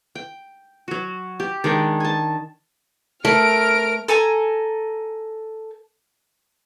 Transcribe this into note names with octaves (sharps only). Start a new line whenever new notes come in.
G5
F#3 F#4
G4
D#3 G#3 D4 G5
G#5 A5
A3 A#4 F6 D7
A4 G#5 A#5